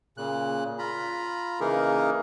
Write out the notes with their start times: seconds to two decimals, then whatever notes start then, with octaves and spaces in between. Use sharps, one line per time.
0.17 A#2 C#3 F#6
0.79 F4 A#5 B5
1.60 C#3 E3 A#3 D#4 G#4 A#4